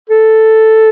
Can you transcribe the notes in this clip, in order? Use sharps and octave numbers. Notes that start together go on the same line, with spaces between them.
A4